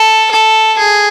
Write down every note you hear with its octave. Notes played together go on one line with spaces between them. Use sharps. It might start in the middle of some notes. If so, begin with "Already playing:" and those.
Already playing: A4
A4
G#4